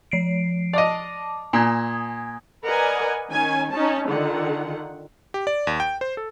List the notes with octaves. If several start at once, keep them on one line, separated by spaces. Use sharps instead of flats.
F3 C7 D7
D5 D#5 A5 D6
A#2 G#5 D#6 G#6
A#4 B4 D5 D#5 F#5 G#5
D#3 C#4 G#5
C#4 D#4 A5
D3 D#3 F4 F#5
G4
D5
D#2
G5
C5
A4